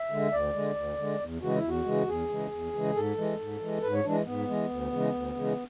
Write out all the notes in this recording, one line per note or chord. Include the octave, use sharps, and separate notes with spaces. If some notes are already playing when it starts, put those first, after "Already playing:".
Already playing: E5
D3 G#3
D2 D5
D3 G#3
D2
D3 G#3
E2
C#3 E3 G#3 F#4
E4
E2
F#4
C#3 E3 G#3
E2 G#4
C#3 E3 G#3
E2
C#3 E3 G#3
G#2 A4
E3 G#3
G#2
E3 G#3
G#2 B4
C#5
E3 G#3 D4
G#2 B3
E3 G#3
D2
C#3 E3 G#3
D2
C#3 E3 G#3